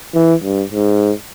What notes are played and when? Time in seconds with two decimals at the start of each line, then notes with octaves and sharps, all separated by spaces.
0.14 E3
0.43 G2
0.71 G#2